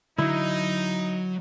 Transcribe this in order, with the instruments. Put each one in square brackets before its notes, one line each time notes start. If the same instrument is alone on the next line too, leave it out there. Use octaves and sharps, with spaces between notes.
[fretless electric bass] D3 [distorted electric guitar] F#3 [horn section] D#4 [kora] E4